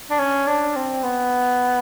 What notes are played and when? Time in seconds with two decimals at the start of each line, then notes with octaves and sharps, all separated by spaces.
0.10 D4
0.19 C#4
0.47 D4
0.76 C4
1.03 B3